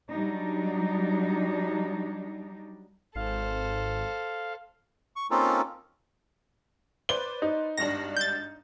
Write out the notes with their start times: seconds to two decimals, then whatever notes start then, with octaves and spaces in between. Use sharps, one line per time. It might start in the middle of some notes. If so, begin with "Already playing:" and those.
0.10 F#3 G3 D4 D#4
3.15 G#1 A4 C5 F5
5.16 C#6
5.31 A#3 C4 C#4 D#4 F4 A4
7.09 B4 C5 D5 G7
7.42 D#4
7.78 G#1 G2 D4 A#6
8.17 G6 A6